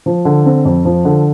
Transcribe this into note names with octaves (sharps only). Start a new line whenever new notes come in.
F3
D3
C4
F2
F3
D3